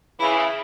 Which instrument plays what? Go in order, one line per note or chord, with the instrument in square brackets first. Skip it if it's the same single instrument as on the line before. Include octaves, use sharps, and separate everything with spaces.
[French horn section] C#3 E3 [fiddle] E4